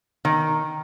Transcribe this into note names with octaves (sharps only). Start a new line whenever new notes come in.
D#3